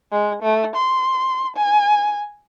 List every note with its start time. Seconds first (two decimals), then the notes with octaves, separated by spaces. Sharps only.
0.12 G#3
0.42 A3
0.76 C6
1.57 G#5